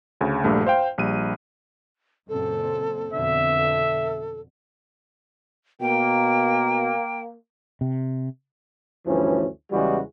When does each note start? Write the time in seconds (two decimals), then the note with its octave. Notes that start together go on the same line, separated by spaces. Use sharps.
0.21 D2 C#3
0.44 A#1 G2 A3
0.67 C5 F5 G5
0.98 A#1 G3 D#7
2.29 F#1 A#2 C4 A4
3.13 F2 B2 D3 E5
3.56 A4
5.81 B2 A#3 G5
7.81 C3
9.06 D2 G2 E3 F3 C#4
9.72 E2 C#3 E3 G3 G#3 F#4